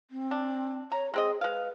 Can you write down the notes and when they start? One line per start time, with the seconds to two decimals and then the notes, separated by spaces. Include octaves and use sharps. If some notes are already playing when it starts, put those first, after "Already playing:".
0.11 C4
0.31 D4
0.92 C#5 A#5
1.14 G#3 C4 G#4 D#5
1.41 G#3 B4 F5